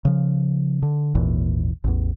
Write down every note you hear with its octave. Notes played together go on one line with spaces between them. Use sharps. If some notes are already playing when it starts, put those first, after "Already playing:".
C#3 F3
D3
G#1 D#2 A#2 E3
A1 E2